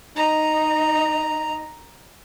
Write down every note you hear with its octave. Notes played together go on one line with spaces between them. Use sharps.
D#4 D#5 A#5